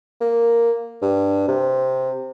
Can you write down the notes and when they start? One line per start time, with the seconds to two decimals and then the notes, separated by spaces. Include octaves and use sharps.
0.21 A#3
1.02 G2
1.48 C3